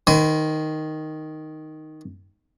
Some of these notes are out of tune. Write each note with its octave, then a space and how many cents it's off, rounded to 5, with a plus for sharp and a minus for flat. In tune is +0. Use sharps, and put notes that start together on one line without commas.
D#3 +0 C5 -45 G#5 +25